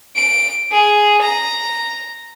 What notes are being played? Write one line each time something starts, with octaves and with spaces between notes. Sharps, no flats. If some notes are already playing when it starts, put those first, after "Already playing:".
D7
G#4
A#5